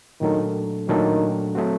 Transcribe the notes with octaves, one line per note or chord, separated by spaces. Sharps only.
A#2 D#3 F#3 A3 D4 A4
A#2 D#3 F#3 A3 D4 A4
F#3 A3 C4 F#4